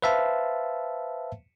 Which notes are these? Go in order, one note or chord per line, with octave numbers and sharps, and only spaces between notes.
B4 C5 E5 F5 A5